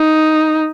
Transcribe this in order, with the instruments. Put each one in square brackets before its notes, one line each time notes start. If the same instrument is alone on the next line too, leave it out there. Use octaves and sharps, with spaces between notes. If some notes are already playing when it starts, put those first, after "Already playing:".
Already playing: [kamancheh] D#4